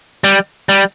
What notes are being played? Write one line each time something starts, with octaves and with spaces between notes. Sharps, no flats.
G3
G3